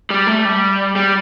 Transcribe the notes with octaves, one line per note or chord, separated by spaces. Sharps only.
G3
A3
G3
G3